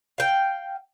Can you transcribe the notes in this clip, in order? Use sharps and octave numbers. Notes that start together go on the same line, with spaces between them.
F5 G5